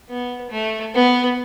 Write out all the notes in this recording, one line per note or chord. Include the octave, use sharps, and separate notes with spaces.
B3
A3
B3